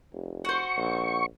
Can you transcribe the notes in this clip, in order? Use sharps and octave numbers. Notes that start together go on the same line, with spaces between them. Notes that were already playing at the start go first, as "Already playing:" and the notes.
F1
F#4 C5 C#6
A#1